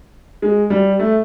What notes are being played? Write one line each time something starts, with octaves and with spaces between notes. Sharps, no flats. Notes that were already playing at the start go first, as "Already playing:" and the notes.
G#3
G3
A3